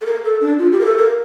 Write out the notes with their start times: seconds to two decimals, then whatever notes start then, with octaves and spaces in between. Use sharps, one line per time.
0.01 A4
0.06 A#4
0.24 A4
0.41 D4
0.59 F4
0.72 G4
0.80 A#4
0.85 A4
0.98 A#4